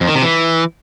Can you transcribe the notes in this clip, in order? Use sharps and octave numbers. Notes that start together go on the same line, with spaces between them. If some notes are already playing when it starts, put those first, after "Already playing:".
F2
D#3
C3
E3